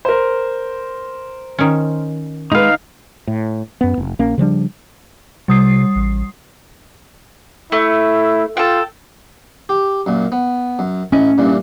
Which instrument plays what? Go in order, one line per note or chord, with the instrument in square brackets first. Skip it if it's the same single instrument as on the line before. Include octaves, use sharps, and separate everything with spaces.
[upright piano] A#4 C5
[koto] D#3 C#4
[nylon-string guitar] G#3 B4 [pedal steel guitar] D#4 F5
[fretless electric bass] A2
F#2 B3
F1
A#1 A#3 C#4
C#3 F3 G3 D4
[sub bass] C3 [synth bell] G3 D#6 C7
[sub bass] A1
[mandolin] A3 [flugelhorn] E4
[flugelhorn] F4 [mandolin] A4 G5
[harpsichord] G4
F#2 A#2
B3
F#2
[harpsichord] A1 E4 D#5 [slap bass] C#4
[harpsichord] G2 A#2 E3